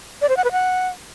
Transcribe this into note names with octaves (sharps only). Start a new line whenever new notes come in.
D5
C5
F#5
B4
F#5